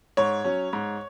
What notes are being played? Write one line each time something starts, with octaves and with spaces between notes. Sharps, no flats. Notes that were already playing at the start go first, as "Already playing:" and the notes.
G#2 C#5
F#3 C#4
G#2